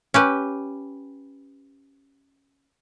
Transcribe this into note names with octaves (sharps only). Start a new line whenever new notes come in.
C#4 G4 B4